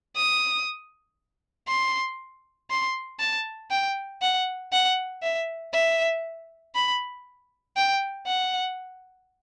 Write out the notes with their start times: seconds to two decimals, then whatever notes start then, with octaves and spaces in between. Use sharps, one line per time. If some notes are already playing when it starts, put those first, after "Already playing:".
0.16 D#6
1.68 C6
2.70 C6
3.20 A5
3.71 G5
4.22 F#5
4.73 F#5
5.23 E5
5.74 E5
6.75 B5
7.77 G5
8.27 F#5